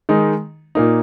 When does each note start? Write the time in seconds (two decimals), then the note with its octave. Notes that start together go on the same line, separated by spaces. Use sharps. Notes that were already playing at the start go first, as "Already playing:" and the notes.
0.09 D#3 G#3 D#4
0.75 A#2 A#3 D#4